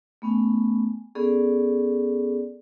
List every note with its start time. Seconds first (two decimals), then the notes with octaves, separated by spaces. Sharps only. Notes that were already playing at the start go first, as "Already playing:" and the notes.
0.22 A3 B3 C#4 G#5
1.15 B3 C#4 G#4 A4 D5